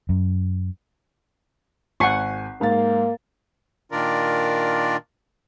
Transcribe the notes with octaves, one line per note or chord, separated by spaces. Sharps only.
F#2
G#1 F#5 G#5 C#6 C7
G#2 A#3 F5 A6
A#2 D#3 D4 F4 A#4 D5